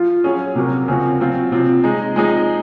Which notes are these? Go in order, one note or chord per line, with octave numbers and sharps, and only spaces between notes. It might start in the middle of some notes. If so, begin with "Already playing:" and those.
Already playing: F3 F4
F#3 C#4 G#4
C3 F#3 A#3
C#3 F3 C4 F#4
F#3 C4 F4
C3 F3 C4 F4
G#3 D#4 G#4
F3 G#3 C4 D#4 G#4